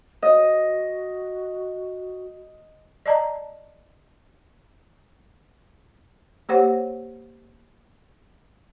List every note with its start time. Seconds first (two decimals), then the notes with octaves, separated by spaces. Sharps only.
0.22 F#4 D#5
3.06 D5 D#5 A5 A#5
6.49 A#3 G4 C5 C#5 F#5